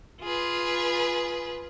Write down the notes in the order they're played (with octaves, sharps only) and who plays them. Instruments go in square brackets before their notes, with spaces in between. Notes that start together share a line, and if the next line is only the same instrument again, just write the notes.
[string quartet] F4 G#4 B4